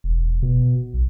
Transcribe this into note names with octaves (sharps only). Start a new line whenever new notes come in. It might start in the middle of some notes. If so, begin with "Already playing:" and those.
E1
B2
B1